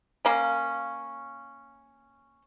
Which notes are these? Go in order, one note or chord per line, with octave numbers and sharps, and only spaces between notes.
A#3 C#4